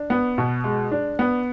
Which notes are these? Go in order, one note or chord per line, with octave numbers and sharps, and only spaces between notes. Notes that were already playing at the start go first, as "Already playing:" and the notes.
Already playing: D4
B3
B2
G#3
D4
B3